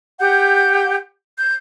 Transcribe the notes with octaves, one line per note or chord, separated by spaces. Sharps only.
G4 F#5 G6
G6